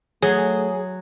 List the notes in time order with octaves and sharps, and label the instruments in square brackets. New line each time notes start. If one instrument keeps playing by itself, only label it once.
[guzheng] F#3 [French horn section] A3 [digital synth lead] G#4 [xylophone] C#5